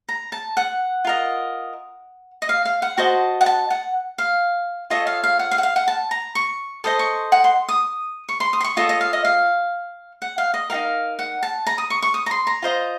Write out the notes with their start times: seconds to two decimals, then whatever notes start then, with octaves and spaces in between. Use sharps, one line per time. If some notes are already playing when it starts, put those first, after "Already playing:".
0.09 A#5
0.32 A5
0.57 F#5
1.05 F4 A#4 D#5
2.42 D#5
2.49 F5
2.65 F5
2.82 F#5
2.98 F#4 C5 D#5 A5
3.41 F#5
3.46 A5
3.70 F#5
4.18 F5
4.90 F4 A4 C#5 D#5
5.07 F5
5.24 F5
5.39 F#5
5.51 F5
5.58 F#5
5.63 F5
5.76 F#5
5.88 A5
6.11 A#5
6.35 C#6
6.84 A4 C5 D#5 D#6
6.99 C#6
7.32 F#5
7.44 C6
7.69 D#6
8.29 C#6
8.40 C6
8.53 D#6
8.61 C6
8.64 C#6
8.77 F4 A4 C#5 D#5
8.89 D#5
9.01 F5
9.13 D#5
9.25 F5
10.22 F#5
10.38 F5
10.54 D#5
10.70 D#4 F#4 A#4 F5
11.19 F#5
11.43 A5
11.67 A#5
11.78 D#6
11.90 C#6
12.02 C#6
12.14 D#6
12.26 A#5
12.31 C6
12.47 A#5
12.62 F4 C5 D#5